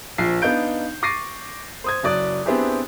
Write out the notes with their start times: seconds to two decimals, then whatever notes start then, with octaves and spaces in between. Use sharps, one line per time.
0.18 A#1 F3 C7
0.42 B3 D4 D#4 F5 G6 D7
1.03 C#6 D6 A6 A#6 C7 D#7
1.84 C5 D#6 G#6
2.03 F#1 F#3 D5 D6 D#6 F#6
2.46 B3 C4 D4 E4 G4 G#4